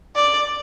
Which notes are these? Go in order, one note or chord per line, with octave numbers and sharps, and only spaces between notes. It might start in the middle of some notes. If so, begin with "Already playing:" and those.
D5